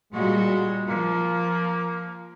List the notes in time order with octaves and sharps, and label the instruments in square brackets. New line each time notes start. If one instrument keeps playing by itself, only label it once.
[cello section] A#2 G3 F#4 [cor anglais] G#3
[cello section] F3 [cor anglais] A#3